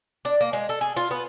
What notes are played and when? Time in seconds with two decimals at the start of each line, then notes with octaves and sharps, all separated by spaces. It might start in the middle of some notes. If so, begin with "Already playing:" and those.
0.25 D4
0.41 A#3
0.53 G#3
0.69 A4
0.81 G#4
0.96 F4
1.11 B3